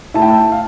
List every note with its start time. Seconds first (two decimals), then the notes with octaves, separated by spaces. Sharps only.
0.14 A3 E4 A5
0.22 G5
0.28 A5
0.52 F5